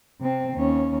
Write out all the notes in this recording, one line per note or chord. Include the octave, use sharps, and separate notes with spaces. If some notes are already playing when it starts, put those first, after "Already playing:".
C3 C4
D#2 C#4